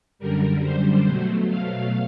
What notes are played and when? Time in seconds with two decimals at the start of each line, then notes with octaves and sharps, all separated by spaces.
0.19 F#2 D3 G3 A#4
0.62 C5
1.05 B2 F#3 A3
1.48 F5